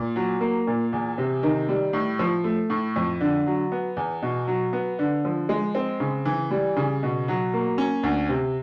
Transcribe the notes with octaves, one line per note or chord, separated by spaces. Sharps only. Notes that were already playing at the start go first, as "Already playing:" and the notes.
Already playing: A#2
F#3
A#3
A#2
E2
C3
D#3
G3
A2
F3
A3
A2
F2
D3
F#3
B3
E2
B2
F#3
B3
D3
F3
G#3
C4
C#3
E3
G3
C#3
B2
F#3
A#3
C#4
D2
C3